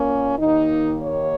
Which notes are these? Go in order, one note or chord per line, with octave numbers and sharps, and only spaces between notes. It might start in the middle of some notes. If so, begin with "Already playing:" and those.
Already playing: A#2 A#3 C#4
D#2 D#3 A#3 D#4
C#5